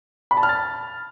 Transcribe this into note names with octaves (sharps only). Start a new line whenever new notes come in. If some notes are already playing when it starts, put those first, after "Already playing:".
B5
A5
F6
A6